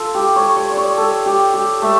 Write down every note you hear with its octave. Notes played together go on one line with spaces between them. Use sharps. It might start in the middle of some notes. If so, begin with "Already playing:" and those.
Already playing: F4 A4
G4
C#5
C#5
D5
C#5
A4
G4
G4
A3